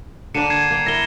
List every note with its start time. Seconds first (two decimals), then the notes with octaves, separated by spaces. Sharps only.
0.34 D3 A#3 D4 C#7 D#7 E7
0.50 G#6 C7 E7
0.71 A#3 G5
0.86 E4 A#4 A#6 G7